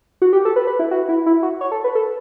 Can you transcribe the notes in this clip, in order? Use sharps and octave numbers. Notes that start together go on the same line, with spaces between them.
F#4
G4
A4
B4
B4
E4
F#4
E4
E4
F#4
C#5
A4
B4
A4